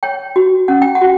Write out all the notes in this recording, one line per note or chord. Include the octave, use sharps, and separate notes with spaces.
C#5 G5
F#4
C#4 F#5
G5
F#5
F#4